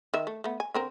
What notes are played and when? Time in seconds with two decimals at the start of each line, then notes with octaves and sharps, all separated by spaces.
0.14 D#3 E5
0.27 A3
0.44 A3 B3
0.60 G#5
0.74 D3 C4 A#4